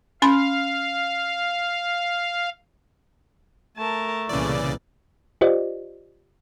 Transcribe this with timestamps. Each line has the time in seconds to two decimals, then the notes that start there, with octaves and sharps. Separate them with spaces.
0.22 C#4 F5 B5 C6
3.77 A3 A#4 A5
4.29 C2 A#2 C#3 E3 D5
5.41 F4 G4 C5 D5 D#5